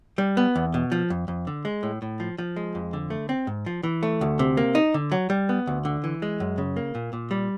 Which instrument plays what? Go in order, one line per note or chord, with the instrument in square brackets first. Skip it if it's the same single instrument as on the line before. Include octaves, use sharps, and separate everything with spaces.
[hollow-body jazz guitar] G3
B3
E2
B2
F3
F2
F2
D3
G#3
A2
A2
F3
F3
G#3
F2
D3
A3
C4
G#2
F3
E3
A3
D2
C3
A#3
D#4
D3
F#3
G3
B3
D2
D3
E3
G#3
F#2
C#3
A#3
A#2
A#2
G3